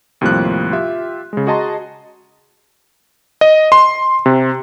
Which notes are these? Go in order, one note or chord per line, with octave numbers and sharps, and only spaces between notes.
D#2 A2 C3 F3 G3 F#6
F4 G4 E5
C#3 G#3
F#4 G#4 D#5 A5 A#5 C6
D#5
C6
C3